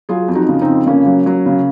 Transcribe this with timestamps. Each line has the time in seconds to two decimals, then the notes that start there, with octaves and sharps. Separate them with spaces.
0.09 F#3 F4 G#4
0.28 F2
0.35 D#4 F#4
0.49 C#3
0.61 C4 D#4
0.68 F2
0.86 C#3 A#3 C#4
1.06 F#3
1.26 F#3
1.46 C#3